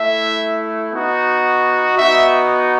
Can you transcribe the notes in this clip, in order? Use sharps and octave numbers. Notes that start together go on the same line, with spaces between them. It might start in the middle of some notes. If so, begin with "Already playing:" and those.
Already playing: A3 E4 E5
B3 D#4 F#4
B3 D#4 F#4 E5